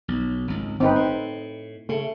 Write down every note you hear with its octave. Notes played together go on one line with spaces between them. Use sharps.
B1
G#1 C#2
G1 C4 D#4 B4
A2
C#3 A3